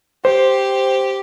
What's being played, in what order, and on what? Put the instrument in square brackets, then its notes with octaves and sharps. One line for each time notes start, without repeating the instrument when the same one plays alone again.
[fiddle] G4 [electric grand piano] C5